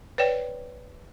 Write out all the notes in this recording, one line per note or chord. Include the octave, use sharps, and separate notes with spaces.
B4 C#5 D5 G5